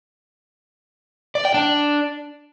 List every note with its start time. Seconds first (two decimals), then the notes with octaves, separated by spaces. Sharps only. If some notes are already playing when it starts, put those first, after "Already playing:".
1.35 D5
1.45 G5
1.54 D4